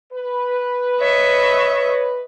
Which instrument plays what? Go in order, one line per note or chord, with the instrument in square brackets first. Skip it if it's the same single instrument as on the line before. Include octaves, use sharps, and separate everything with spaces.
[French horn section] B4
[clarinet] C#5 [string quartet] D#5 E5 C#6